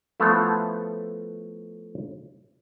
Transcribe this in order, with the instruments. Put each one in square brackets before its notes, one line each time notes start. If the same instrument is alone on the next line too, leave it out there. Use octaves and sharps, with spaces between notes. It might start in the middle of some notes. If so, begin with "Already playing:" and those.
[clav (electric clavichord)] F3 A3 B3 E4 A4 F5